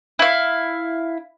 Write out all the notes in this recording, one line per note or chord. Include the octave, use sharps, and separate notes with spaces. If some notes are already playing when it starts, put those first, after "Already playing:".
E4 F5